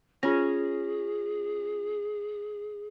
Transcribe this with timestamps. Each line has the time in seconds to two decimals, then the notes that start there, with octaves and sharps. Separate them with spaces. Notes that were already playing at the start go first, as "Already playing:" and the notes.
0.23 C#4 F4 G#4 A#6